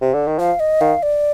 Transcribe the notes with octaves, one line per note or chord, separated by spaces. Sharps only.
C3
D3
D#3
F3 F5
D#5
D#3 F5
D5